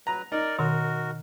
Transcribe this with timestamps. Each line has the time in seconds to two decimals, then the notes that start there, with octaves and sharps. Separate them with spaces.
0.07 F#3 B4 A#5
0.32 D#4 A#4 D5
0.59 B2 D#3 F#4 A#4